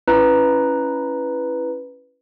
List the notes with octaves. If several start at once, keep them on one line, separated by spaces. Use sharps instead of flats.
C#4 E4 B4 A#5